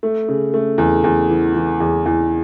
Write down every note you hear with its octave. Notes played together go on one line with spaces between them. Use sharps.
A3
C#3
A3
E2
E2
E3
E3
E2
E2